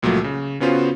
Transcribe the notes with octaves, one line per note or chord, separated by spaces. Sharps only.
C#2 A#2 F3 F#3 A3
C#3
C#3 B3 C#4 F4 F#4 C5